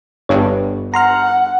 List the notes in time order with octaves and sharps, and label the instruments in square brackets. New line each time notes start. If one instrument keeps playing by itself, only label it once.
[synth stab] G1 G2 [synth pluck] C#5
[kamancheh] F#5 [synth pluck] A#5 C6 F6